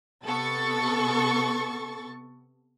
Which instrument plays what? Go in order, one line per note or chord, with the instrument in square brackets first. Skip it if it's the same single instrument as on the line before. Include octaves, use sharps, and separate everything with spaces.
[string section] C3 B3 A4 C#6 A6